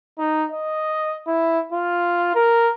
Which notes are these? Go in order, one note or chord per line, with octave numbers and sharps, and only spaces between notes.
D#4
D#5
E4
F4
A#4